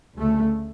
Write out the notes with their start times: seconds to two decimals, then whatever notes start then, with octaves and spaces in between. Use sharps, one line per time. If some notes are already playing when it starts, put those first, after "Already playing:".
0.18 D2 C#3 A3